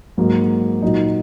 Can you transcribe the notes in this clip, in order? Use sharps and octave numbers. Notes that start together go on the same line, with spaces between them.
G#2 F#3 A#3
A#2 F#3 A#3 D#4